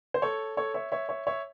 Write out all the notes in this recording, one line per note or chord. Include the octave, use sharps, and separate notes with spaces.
C5
A4 C#5
A4 C#5
C#5 E5
C#5 E5
C#5 E5
C#5 E5